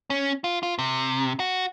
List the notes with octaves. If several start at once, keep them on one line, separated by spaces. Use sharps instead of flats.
C#4
F4
F4
C3
F#4